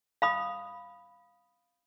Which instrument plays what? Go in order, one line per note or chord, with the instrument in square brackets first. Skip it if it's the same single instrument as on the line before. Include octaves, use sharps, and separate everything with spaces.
[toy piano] F5 B5 D#6